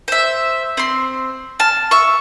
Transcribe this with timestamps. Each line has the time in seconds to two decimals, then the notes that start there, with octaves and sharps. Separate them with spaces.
0.08 C5 E5
0.77 C4 C6
1.59 A5 F6
1.91 E5 C#6